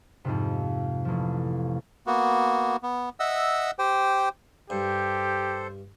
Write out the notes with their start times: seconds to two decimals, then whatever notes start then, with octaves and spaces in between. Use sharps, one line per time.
0.25 F2 G#2 C3
1.05 A1 F3
2.06 A#3 B3 F#4
2.83 B3
3.20 D#5 E5 F#5 E6
3.79 G4 C5 G5
4.70 G2 G4 A4 C5